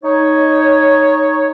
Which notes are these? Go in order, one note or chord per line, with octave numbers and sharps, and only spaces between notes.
D#4 C#5